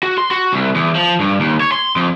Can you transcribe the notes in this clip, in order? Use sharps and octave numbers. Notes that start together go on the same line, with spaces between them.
F#4
C6
F#4
C2
E2
F3
G2
D#2
C#5
C6
F2